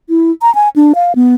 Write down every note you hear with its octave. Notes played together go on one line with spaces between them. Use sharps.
E4
A#5
G#5
D4
F5
B3